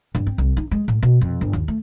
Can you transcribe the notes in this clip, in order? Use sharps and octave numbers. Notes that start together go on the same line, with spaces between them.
G2
C4
C2
D#4
G#3
A2
B2
F2
G1
D#2
A3